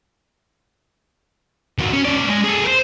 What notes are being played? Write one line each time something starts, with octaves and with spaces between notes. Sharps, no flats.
D#2 F#3
C#4
C#4 D5
G#3
G#4 A4
A#4 C5